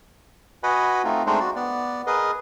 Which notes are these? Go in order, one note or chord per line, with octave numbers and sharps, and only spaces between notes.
F#4 B4 D#5 F#5 G#5 B5
A3 C4 D#4 F4
G#3 A3 C4 D4 D#4 C5
F#4 D5
B3 D5
G#4 A#4 B4 D#5